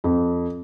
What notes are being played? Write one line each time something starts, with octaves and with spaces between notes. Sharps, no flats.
F2